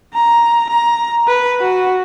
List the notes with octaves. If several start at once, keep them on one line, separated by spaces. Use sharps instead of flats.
A#5
A#5
B4
F#4